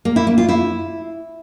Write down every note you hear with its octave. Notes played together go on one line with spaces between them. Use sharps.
A#3
E4
A#3
F4
E4